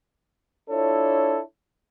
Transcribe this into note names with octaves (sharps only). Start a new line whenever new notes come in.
D4 E4 F4 A4 C#5